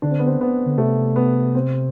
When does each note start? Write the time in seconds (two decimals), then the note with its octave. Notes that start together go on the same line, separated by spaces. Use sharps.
0.02 D3 D4
0.10 C4
0.19 B3
0.26 C4
0.41 B3
0.66 D3
0.78 C3 A3
1.16 B3
1.54 C4